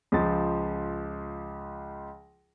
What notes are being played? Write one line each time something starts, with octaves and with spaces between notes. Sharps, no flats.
C#2 F3 A6